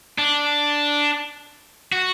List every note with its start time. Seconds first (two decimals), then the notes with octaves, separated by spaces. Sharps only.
0.18 D4
1.92 F#4